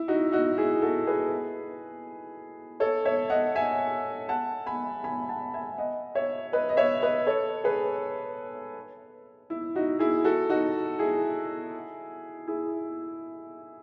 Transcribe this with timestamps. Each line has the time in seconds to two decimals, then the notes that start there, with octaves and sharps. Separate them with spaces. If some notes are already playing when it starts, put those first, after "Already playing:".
Already playing: E4
0.08 D#4 F#4
0.32 D#4 F#4
0.58 E4 G#4
0.82 F#4 A4
1.07 G#4 B4
2.80 A4 C#5
3.05 C#5 E5
3.30 D#5 F#5
3.55 E5 G#5
4.29 F#5 A5
4.66 G#5 B5
5.04 G#5 B5
5.29 F#5 A5
5.54 E5 G#5
5.78 D#5 F#5
6.15 C#5 E5
6.53 B4 D#5
6.69 D#5
6.77 C#5 E5
7.02 B4 D#5
7.26 A4 C#5
7.64 G#4 B4
9.50 E4
9.76 D#4 F#4
9.99 E4 G#4
10.24 F#4 A4
10.49 D#4 F#4
10.99 E4 G#4
12.47 E4 G#4